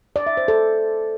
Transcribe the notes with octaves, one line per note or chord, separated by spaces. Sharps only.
D5
E5
C5
A4